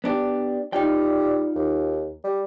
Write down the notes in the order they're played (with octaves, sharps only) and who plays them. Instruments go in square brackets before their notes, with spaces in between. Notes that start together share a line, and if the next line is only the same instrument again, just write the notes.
[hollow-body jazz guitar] B3 D4 G4
[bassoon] G3 [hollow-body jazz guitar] D#4 F4 G5
[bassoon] D#2
G3